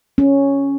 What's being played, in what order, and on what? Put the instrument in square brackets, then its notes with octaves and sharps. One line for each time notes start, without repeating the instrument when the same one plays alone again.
[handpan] C#4